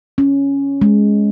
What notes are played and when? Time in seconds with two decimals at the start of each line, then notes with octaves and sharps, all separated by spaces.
0.18 C#4
0.82 G#3